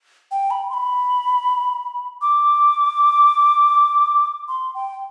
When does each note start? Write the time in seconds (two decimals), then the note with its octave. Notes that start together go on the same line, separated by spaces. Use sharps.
0.31 G5
0.51 B5
0.70 C6
0.74 B5
2.22 D6
4.48 C6
4.75 G5